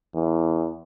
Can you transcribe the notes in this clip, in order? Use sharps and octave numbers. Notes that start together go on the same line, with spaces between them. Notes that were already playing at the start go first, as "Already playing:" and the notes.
E2